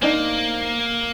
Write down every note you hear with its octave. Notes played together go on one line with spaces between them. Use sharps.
A#3 C4 D4 D#4